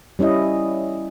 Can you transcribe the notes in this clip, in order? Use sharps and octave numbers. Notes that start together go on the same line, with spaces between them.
G3 C#4 E4 D#5